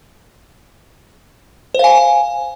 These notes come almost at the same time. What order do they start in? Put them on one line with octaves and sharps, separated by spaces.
C5 F5 G#5